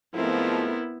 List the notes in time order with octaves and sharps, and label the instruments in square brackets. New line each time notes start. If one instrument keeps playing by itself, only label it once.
[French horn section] G#2 F3 A3 [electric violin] B3 E4 [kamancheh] C4 A#4